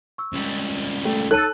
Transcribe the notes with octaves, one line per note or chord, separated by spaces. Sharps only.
C#6 E6
C#2 G3
A3 G5
D#4 A4 C#5 F#6 D#7